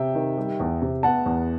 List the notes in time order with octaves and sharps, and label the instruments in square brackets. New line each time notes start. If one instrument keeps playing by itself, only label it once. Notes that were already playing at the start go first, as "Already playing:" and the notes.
Already playing: [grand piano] C3 [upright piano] E5 G5
[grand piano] D#3
G3
E2
C3
[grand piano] B3 [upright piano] F#5 A5
[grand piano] E2